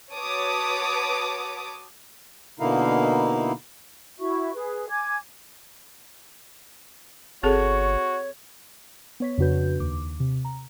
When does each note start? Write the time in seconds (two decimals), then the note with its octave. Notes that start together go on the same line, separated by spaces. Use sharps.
0.15 F#4 B4 C#5 A5 D6 D#6
2.60 B2 D3 A#3 D#4 E4 F5
4.19 E4 F#4 E5 C#6
4.54 G#4 B4
4.90 G#5 D6 G#6
7.43 G1 C4 F#4 G#4 A4 C#5
9.20 B3 C#5 B6
9.38 F2 C#3 D4 F#4 B4 G6
9.80 D#2 D6
10.20 C3
10.45 A#5